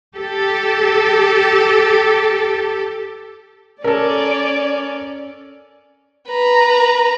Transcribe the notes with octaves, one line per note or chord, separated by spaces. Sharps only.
G4 A4
C#4 A4 A#4 D5
B4 A#5